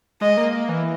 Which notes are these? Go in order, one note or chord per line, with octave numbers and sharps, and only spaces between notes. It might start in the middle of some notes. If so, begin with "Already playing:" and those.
G#3 D#5
A#3
A#3
E3